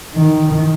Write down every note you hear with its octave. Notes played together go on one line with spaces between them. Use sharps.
D#3